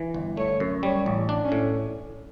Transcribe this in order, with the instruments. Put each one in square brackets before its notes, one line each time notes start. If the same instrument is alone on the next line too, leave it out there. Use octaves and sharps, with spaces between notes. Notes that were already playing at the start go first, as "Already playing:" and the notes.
Already playing: [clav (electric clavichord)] E3
G1
[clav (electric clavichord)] A3 [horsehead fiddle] C#5
[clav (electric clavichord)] F#2
[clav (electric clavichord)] G3 [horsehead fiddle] C#5
[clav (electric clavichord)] A1
D4
[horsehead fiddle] C#4
[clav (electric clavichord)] A2